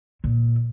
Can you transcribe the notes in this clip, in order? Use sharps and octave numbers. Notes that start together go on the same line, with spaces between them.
A#2